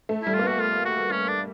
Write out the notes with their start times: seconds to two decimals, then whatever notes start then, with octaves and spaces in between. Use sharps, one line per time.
0.09 A3
0.22 G3 E4
0.34 A#3 F4
0.43 B3 F#4
0.60 F4
0.85 F#4
1.11 C#4
1.28 D4